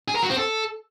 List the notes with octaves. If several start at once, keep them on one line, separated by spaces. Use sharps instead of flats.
G#4
A#4
F#4
C4
A4